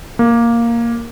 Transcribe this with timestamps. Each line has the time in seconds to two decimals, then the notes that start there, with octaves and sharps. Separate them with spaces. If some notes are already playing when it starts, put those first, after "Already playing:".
0.19 A#3